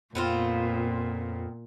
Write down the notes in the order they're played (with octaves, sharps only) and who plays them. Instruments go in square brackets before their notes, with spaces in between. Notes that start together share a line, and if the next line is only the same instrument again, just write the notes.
[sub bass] F2 [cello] A#2 [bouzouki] B3 C4 F4